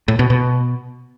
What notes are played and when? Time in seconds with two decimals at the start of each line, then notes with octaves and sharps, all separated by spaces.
0.08 A2
0.19 B2
0.30 B2